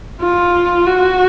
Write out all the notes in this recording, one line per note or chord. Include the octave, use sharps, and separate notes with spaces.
F4
F#4